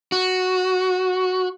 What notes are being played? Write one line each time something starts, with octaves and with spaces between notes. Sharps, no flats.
F#4